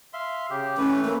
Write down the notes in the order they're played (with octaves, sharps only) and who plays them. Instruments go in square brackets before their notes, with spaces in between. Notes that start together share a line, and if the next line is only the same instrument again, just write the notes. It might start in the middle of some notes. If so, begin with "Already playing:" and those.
[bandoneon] E5 F5 C6
C#3 G4
[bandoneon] E3 A3 B4 [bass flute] C#4
[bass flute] A#3